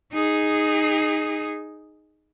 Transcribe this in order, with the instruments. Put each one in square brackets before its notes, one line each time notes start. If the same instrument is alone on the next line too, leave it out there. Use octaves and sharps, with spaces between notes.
[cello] D#4 G#4